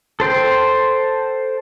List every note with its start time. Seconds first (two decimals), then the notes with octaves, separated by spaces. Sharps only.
0.20 A4 C5 G5